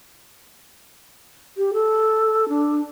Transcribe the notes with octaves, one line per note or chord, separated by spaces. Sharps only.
G4
A4
D4